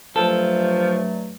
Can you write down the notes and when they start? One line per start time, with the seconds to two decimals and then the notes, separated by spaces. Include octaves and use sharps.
0.16 G2 F3 F#3 A3 A4